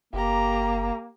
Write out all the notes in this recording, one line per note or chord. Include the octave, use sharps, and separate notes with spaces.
F#1 A#3 G4 A#5